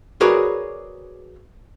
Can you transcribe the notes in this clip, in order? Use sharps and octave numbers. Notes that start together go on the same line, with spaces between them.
F#4 G#4 A#4 B4 C#5 D5